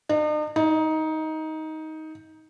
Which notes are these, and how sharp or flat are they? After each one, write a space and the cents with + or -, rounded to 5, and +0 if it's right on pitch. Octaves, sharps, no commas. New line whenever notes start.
D#4 -45
D#4 +15